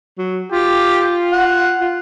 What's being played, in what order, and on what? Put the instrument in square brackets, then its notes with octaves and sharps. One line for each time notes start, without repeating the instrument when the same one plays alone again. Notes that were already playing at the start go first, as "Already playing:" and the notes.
[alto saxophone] F#3
[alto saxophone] F4 [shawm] G4
[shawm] F#5
[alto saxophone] F4